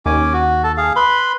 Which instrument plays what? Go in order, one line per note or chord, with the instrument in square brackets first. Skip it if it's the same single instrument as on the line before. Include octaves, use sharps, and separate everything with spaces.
[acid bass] D#2 [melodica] C#4 G#5 D6
[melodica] F#4
A4 A5
G#4 F5
B4 B5 C6